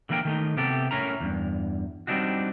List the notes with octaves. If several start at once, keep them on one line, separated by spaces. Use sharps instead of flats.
D3 E3 A#3 A#4 G5
D#3 A3 D#4
C3 B3 G4 A4
A2 C#4 E4 A#4 A#5
E2 G2
G3 C4 D4 D#4 F#4